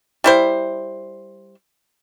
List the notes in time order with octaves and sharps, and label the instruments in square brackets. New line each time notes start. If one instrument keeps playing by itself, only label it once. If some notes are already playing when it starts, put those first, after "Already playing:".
[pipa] G3 E4 C5